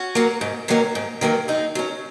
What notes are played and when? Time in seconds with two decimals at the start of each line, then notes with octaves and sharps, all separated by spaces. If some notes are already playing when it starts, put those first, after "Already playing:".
Already playing: C#4 F#4
0.15 F#3 A#3
0.41 G#2
0.68 D#3 F#3 A#3 C#4
0.95 G#2
1.21 D#3 F#3 A#3 C#4
1.48 F#2 D#4 G#4
1.75 F#3 C#4